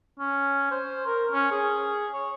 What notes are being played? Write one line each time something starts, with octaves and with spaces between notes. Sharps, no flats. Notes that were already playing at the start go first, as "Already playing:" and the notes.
C#4
C5
A#4
C#4
G#4
C#5